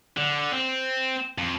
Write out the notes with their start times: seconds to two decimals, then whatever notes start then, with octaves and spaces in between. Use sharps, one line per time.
0.17 D3
0.53 C4
1.38 F2